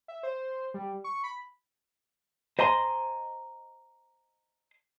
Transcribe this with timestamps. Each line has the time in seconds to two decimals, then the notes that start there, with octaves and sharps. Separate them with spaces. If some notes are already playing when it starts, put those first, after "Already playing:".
0.08 E5
0.23 C5
0.74 G3
1.04 C#6
1.24 B5
2.59 C5 D#5 G#5 A#5 C6